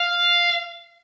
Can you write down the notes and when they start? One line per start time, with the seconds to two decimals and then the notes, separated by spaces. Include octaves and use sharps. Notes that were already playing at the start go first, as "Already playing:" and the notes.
Already playing: F5